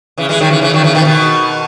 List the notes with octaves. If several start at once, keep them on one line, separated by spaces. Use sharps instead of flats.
C#3 E3
E3 G#3
D#3 F#3
C#3 E3
C#3 E3
D#3 F#3
C#3 E3
B2 D#3
E3
B2 D#3